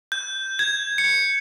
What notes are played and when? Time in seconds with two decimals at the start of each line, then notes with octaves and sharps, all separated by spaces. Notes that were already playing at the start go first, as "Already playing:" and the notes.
0.12 G6
0.59 G#6
0.98 C#7